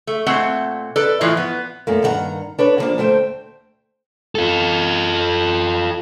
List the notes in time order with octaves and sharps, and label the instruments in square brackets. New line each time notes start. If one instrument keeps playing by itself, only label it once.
[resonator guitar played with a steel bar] A3
A#2 A3 C4 F#5
A4 B4 D5
A2 E3 F3 F4
B3
[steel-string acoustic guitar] F#2 A3 A#3
G2 D#3 F4 F#4 F#5 A#5
D4 B4 C#5
D3 F3 A#3 D4
D2 A3 C5 G5
[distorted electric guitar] F4 A4